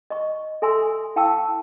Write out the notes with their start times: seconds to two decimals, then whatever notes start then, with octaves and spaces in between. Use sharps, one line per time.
0.10 D#5 C#6
0.62 A4 E5 G#5 C6 E6
1.16 E4 F5 G5 A5 C#6 E6